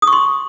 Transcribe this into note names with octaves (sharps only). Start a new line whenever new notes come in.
D#6
C#6
C6